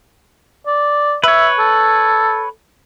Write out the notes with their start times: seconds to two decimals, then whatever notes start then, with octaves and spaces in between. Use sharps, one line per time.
0.67 D5
1.24 B4 C#5 E5
1.59 A4